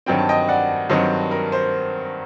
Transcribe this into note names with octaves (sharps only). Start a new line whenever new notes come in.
G2 D#3 F#3 C4 G5
A5
D#5 G5
D5 F#5
G2 D#3 F#3 C4 C5 D#5
A#4
C5